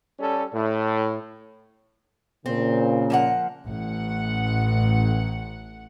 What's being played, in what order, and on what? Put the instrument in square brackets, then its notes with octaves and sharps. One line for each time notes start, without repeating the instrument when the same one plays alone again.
[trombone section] G3 C#4 A4
A2
[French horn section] A#2 C#3 [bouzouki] C4
[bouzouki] F3 A#3 F#5
[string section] A1 F#5